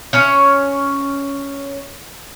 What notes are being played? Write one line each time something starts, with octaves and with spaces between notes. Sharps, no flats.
C#4 C#5